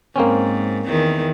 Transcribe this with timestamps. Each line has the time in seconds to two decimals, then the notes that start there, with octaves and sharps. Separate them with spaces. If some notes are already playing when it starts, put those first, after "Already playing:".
0.16 G#2 A#3 C4 C#4
0.86 E2 D#3